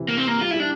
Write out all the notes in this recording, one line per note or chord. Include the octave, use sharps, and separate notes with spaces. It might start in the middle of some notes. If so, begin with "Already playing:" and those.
Already playing: C3 E3
A#3
C4
A#3
G3 F4
G3 E4
D4